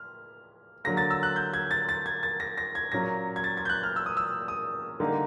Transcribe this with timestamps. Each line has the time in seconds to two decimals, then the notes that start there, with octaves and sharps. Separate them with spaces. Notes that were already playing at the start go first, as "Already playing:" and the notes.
Already playing: F6
0.84 D3 F#3 A#3 A#6
0.97 A6
1.10 E6
1.23 F#6
1.36 G6
1.53 G#6
1.71 A6
1.89 A6
2.06 G#6
2.23 A6
2.40 A#6
2.58 A#6
2.75 G#6
2.92 A#2 F#3 A#3 C#4 A#6
3.36 G#6
3.44 A6
3.57 G#6
3.65 G6
3.69 F#6
3.83 F6
3.96 E6
4.06 D#6
4.17 E6
4.48 D#6
5.00 D3 G3 A#3 D#4